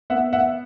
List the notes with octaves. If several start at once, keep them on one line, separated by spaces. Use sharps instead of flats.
B3 E5 F#5
E5 F#5